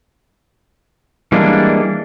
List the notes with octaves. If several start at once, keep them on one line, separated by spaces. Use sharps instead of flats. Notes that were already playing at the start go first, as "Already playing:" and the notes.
E3 G3 G#3 A#3 D4